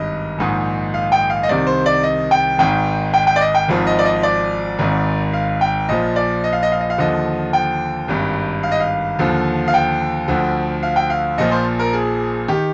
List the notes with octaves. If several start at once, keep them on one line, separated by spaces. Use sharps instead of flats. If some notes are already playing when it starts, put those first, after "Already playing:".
Already playing: G#1 G2 D#3 D#5
A#1 G#2 D#3
F5
G5
F5
D#5
C2 C3 D#3 D5
C5
D5
D#5
G5
G#1 G#2 D#3 G5
G5
G5
D5
D#5
G5
G#1 G#2 F3
D#5
D5
D#5
D5
G#1 G#2 D#3
F5
G5
A#1 A#2 F3 D#5
D5
D#5
F5
D#5
F5
D#5
F5
D#2 D3 F3 D#5
G5
G#1 G2 D#3
F5
D#5
F5
D#2 D3 F3
F5
G5
D2 D3 F3
F5
G5
F5
A#1 A#2 F3 D#5
C5
A#4
G#4
D#3 G4